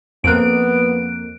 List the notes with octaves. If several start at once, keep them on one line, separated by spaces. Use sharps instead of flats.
F2 A#3 B3 F#6 D7